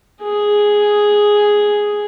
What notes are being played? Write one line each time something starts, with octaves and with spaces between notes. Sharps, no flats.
G#4